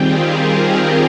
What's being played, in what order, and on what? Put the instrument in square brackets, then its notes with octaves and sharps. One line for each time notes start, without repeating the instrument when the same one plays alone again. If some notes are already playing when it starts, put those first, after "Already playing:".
Already playing: [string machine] D#3 G3 C4 F4 G4 G#4
G4 A#4